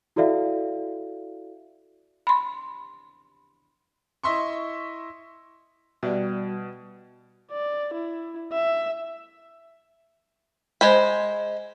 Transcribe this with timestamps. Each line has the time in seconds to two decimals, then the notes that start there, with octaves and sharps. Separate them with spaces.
0.16 E4 F#4 A4 D5 E5 F5
2.27 B5 C6
4.23 E4 D#5 E5 C6 C#6
6.03 B2 G3 F#4 G4 D5 E5
7.52 D5
7.94 E4
8.53 E5
10.81 G#3 C5 B5